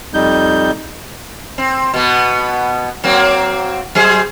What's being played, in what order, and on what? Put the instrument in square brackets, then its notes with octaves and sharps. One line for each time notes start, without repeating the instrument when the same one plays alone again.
[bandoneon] F2 G3 D#4 G6
[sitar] C4
B2 B3
F#3 A#3 C4
F#3 G#4 C5